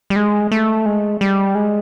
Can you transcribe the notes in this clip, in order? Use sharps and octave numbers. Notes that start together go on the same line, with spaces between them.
G3
G#3
A3
G#3
G3
G#3